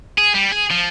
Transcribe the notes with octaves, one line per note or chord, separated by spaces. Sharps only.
G#4
G3
G#4
F3